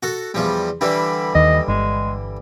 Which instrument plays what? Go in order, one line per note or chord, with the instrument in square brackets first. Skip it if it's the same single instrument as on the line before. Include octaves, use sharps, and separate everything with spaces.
[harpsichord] F#4 A4
E2 F3 G3
[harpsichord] D3 E3 G3 [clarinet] B5
[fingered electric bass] D#2 [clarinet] D#5
[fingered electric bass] G1 [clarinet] G#3